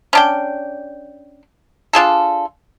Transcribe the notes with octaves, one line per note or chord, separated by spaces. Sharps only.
C#4 D4 G5
D4 F4 G#4 A4